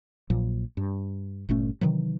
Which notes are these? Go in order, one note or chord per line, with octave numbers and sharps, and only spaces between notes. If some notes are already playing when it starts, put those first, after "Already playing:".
A#1 A#2 F3 F#3
G2
G1 A#2 A3 C#4
C3 D#3 E3 F#3